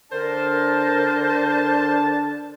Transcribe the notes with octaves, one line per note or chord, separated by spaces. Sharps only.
D3 D4 A#4 C5 A5